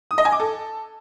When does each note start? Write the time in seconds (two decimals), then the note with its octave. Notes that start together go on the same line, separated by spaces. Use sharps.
0.11 D#6
0.18 D#5
0.25 G#5
0.32 D6
0.40 A4